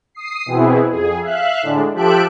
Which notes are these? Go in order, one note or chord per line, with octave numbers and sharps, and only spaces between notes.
D#6 C7
B2 E3 B3 C4 E4 G#4
F2 G#4
E5 F5 F#6
A2 D3 G#3 D4
F3 G4 A4 E5 F#6 D7